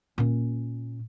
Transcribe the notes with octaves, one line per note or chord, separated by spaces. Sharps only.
A#2 C#4